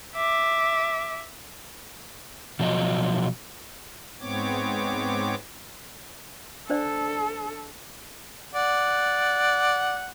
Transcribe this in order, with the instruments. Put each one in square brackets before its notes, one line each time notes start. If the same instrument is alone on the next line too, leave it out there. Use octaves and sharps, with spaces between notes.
[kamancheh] E5 D6
[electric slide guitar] B2 F3 F#3 D#5
[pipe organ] G#2 B3 C4 C#5 D6
[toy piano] D4 C5 D5 [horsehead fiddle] A4
[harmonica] D5 F#5